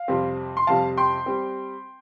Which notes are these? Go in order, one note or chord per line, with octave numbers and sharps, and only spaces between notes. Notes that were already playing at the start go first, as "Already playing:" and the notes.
Already playing: F5
F2 C3 G3 C4
C6
F2 C3 G3 C4 F5 A5
G5 C6
G3 C4